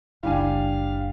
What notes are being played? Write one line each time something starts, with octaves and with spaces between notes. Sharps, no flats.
F#1 C#2 G3 D4 E4 F5 G#5